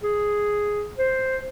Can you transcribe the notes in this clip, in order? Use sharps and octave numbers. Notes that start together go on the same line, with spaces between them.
G#4
C5